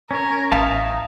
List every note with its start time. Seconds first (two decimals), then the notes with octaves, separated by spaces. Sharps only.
0.11 C#4 A#4 C#5
0.52 A1 D#4 E5 F5 A5